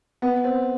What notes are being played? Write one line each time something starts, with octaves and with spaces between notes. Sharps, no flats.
B3
C4